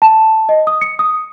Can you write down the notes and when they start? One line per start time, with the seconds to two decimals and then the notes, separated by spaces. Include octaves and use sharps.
0.02 A5
0.49 D#5
0.67 D#6
0.81 C#7
0.99 D#6